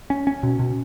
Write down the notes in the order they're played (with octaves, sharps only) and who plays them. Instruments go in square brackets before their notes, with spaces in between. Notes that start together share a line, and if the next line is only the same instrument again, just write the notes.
[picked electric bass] C#4
C#4
B2
B2